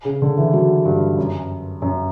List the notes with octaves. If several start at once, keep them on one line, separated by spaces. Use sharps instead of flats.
C#3
D3
E3
F#3
G2
F#2
F#2